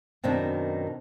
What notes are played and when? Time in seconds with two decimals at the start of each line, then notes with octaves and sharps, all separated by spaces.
0.24 F#2 B2 D#3 C4 D4